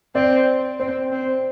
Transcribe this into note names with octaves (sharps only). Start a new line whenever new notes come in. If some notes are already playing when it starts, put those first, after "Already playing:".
C4 D5
C4 C5
C4